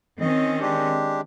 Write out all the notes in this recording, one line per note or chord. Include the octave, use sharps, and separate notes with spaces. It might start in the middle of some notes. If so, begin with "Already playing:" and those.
D#3 C4 C#4 D#5
G#3 D4 G4